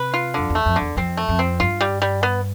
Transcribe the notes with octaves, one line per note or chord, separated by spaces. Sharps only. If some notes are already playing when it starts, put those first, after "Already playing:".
Already playing: C3 B4
F4
F2 D3
E2
A3
F2
D3
E2
F2 C4
A3
F2
C4
G2 F4
G3
G3
B3